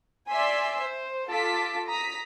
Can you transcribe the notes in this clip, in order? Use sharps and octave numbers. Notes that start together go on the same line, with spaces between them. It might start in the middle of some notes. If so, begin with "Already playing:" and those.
D5 E5 G#5 C6 E6 B6
C5
F4 A4 A5 D6 B6
A#5 D#6 B6